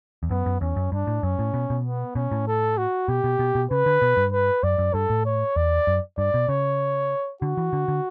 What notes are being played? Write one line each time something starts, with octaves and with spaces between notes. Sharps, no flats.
E2
F#2 B3
F#2
E2 C#4
F#2
G2 D4
A2
F#2 C#4
A2
B2
B2
B3
B2 C#4
A2
A4
F#4
B2 G4
B2
B2
B2
C#3 B4
D3
B2
G2
B4
F#2 D5
F#2
G2 A4
A2
C#5
E2 D5
F#2
G2 D5
B2
C#3 C#5
D3 F#4
E3
D3
D3